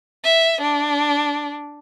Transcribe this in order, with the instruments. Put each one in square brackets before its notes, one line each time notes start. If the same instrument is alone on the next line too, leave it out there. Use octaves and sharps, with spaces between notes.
[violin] E5
D4